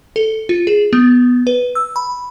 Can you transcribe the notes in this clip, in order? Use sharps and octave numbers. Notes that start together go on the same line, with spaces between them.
A4
F4
G#4
B3
B4
E6
B5